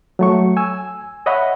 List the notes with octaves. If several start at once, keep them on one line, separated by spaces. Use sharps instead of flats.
F#3 A3 C#6
G#5 E6
C#5 D#5 E5 F#5 B5